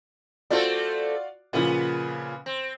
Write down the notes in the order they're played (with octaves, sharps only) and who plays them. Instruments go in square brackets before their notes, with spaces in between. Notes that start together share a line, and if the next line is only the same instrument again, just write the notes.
[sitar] A3 C4 A4 [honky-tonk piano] F4 F#4 D5
[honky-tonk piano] A#2 C#3 F3 [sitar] B3
[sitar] C4